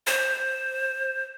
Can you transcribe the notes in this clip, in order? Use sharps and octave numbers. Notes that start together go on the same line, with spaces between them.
C5